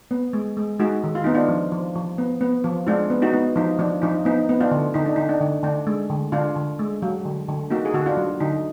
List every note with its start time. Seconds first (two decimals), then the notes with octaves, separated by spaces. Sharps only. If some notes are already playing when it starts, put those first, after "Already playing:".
0.11 B3
0.33 G#3
0.57 G#3
0.80 G#3 D#4 F#4
1.04 D#3
1.15 F4
1.24 B3 D#4
1.34 D4 F4
1.49 F3
1.72 F3
1.95 F3
2.18 B3
2.41 B3
2.64 F3
2.87 G#3 D4 F4
3.10 B3
3.22 D#4 F#4
3.34 B3
3.56 F3 D#4
3.79 F3 D4
4.02 F3 D#4
4.25 B3 D#4
4.49 B3
4.60 D4 F4
4.71 D3
4.94 D3 D#4
5.06 D4
5.16 D3 D#4
5.29 D4
5.41 D3
5.63 D3 D4
5.87 G#3
6.10 D3
6.32 D3 D4 F4
6.56 D3
6.79 G#3
7.02 F#3
7.25 D3
7.49 D3
7.70 A#3 D#4 F#4
7.85 G#4
7.94 D3 F#4
8.06 D4 F4
8.17 F#3
8.40 D3 D#4